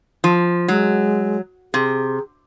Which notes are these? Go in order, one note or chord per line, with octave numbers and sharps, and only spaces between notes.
F3
F#3 G#3
C3 G#4